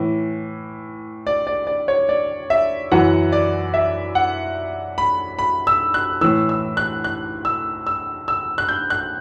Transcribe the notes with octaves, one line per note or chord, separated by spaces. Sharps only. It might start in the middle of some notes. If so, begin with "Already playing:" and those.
Already playing: A2 E3
D5
D5
D5
C#5
D5
E5
F#2 E3 F#5
D5
E5
F#5
B5
B5
E6
F#6
A2 E3 E6
E6
F#6
F#6
E6
E6
E6
F#6
G6
F#6